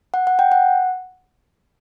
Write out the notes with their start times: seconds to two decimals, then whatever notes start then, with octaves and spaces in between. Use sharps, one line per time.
0.14 F#5
0.27 F#5
0.39 G5
0.52 F#5